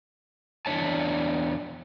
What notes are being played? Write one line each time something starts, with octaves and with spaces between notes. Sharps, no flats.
E2 A#2 D4 C#5 A5